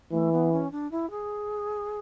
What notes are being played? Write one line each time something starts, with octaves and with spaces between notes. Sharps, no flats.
E3 A3
B3
C#4
D4
E4
G#4